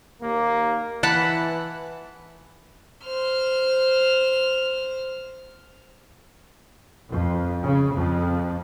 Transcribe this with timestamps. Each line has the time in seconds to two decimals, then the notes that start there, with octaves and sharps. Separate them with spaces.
0.21 D#2 A#3
1.03 E3 F#5 A5 B5
3.05 C5 F6
7.10 F2
7.64 C#3
7.93 F2